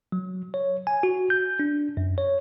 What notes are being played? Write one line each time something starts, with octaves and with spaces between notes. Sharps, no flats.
F#3
C#5
G#5
F#4
G6
D4
F#2
C#5